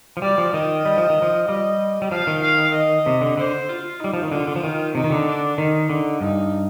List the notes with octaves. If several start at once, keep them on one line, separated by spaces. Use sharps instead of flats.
F3
G3 D5
F3
D#3 D#5
G3
F3
D#3
F3
G3 D#5
G3
F3 F5
D#3
F5
D#5
C3
D3
D3 C5
F4
G3 D#4
F3
D#3
D3 F4
D3
F3
D#3
C3 D#4
D#3
D3
D4
D#3 D#4
D3
G2 D#4